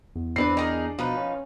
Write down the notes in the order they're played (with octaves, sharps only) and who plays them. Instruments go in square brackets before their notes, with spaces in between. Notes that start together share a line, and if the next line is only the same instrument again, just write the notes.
[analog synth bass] E2
[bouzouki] C4 B4 C5 [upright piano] D4 C7
[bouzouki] D#4 G#4 A#4
[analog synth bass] B2 [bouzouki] F3 D#4 B4
[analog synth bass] C#4